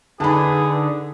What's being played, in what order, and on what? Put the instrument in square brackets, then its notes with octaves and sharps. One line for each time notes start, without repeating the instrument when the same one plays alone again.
[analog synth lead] D3 [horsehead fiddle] D#4 B4 [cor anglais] G#4 [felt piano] A5 B5